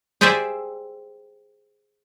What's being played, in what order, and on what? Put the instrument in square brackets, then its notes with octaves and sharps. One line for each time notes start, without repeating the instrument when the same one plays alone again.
[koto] G4 G#4 C5 D5 E5